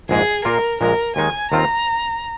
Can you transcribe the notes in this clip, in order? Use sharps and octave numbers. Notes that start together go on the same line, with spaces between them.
A#1 G#2 G#3 G#4
A#2 A#3 F4 A#4
A#1 A#2 G#3 A#4
D#2 D#3 G#3 D#4 G#5
D#2 D#3 C4 F4 A#5